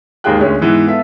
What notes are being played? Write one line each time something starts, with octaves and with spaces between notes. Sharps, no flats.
D#2 G#2 F4 G#4 G5 F#6
D2 D3 G#3 C#4
G#2 E3 B3
B3 F4 A4 E5